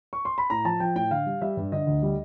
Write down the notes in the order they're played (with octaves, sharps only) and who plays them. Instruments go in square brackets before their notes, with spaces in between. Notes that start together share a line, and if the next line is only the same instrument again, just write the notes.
[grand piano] C#6
C6
B5
A2 A#5
F3 A5
F3 G5
A2 G5
D3 F5
G3
G3 E5
G2
D3 D#5
D2
G3